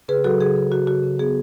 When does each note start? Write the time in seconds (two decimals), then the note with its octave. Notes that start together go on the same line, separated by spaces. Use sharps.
0.09 C#3 G#4 B4
0.24 F#3 F#4 A4
0.40 C#3 G#4
0.56 C#3
0.72 C#3 F#4
0.87 C#3 F#4
1.03 C#3
1.19 B3 G#4